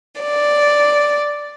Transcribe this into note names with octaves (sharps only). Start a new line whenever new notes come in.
D5